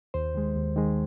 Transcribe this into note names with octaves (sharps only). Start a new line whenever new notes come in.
D#2 C5
D#3 G#3
D#2
D#3 G#3